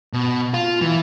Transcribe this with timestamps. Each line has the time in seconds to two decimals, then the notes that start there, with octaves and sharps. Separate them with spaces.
0.13 B2
0.54 F4
0.82 E3